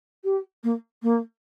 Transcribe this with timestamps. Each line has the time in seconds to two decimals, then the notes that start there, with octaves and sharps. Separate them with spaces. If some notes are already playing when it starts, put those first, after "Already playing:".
0.24 G4
0.63 A#3
1.03 A#3